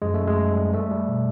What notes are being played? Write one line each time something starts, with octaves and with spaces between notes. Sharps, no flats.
F#2 G#3
F#2 A3
G#3
G3
G3
G3 A3
G3
B2